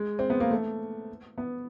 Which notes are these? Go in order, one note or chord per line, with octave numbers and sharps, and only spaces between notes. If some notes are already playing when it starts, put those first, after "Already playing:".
Already playing: G#3
C4
B3
A#3
A3
B3